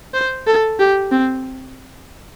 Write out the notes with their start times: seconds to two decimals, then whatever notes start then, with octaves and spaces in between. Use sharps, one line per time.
0.14 C5
0.47 A4
0.79 G4
1.11 C4